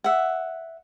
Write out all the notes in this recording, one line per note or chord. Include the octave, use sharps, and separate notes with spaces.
E5 F#5